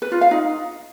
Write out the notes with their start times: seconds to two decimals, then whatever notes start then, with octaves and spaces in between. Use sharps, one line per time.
0.02 B4
0.12 F4
0.21 F5
0.31 D#4